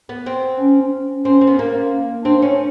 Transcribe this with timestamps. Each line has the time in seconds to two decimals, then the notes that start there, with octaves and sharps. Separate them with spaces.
0.09 B3
0.26 C4
0.59 C#4
1.25 C4 C#4
1.41 C4
1.47 B3
1.59 A#3
2.25 C4 D4
2.42 C#4